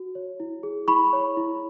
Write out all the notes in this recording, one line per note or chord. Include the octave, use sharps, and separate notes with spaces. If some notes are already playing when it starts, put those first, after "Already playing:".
Already playing: F#4
C#5
E4
G#4
E4 B5 C#6
C#5
E4